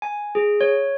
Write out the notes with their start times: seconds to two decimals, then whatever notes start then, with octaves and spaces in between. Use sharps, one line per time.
0.02 G#5
0.35 G#4
0.61 C#5